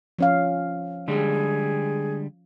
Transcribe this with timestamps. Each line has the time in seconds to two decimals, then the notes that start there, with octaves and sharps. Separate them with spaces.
0.19 F3 C#4 F5
1.08 D3 G3 G#3 G#4